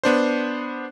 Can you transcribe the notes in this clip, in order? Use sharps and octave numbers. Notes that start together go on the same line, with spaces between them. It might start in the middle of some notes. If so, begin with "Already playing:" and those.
B3 D4 C5